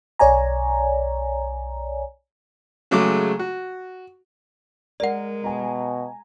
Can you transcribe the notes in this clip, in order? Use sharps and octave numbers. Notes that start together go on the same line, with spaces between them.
B1 C#5 D5 G#5 A#5
C#3 F#3 G#3 A3 D6
F#4
G#3 A#4 D5 F#5
B2 G#5 A#5